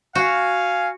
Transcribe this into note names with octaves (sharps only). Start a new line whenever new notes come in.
F#4 F5 G#5